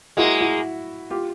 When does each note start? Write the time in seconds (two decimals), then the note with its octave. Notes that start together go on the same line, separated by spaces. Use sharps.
0.17 G#3 A#3 E4 F#4
0.41 E4 F#4
1.10 F4 G4